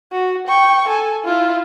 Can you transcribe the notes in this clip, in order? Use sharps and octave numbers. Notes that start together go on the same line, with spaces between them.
F#4
G5 C#6
A4 G#5
E4 F4